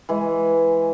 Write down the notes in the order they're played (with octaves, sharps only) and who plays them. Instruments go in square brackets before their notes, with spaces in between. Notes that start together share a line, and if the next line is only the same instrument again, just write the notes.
[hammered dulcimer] E3 G#3